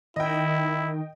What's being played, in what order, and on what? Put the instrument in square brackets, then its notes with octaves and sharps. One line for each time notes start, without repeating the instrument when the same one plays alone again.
[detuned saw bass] D#3 [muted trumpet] E4 [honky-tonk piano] D#5 G5